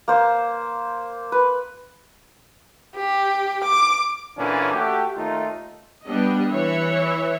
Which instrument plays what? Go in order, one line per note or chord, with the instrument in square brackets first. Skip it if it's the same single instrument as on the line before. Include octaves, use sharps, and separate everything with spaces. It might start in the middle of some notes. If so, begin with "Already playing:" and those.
[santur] A#3 C5 D6
B4
[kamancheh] G4
D6
[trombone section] A#2 D3 E3 C#4 D4
A3 F#4 G4
D#2 A3 D#4 F4
[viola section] G3 B3 D4 D#5
E3 E4 C#5 E5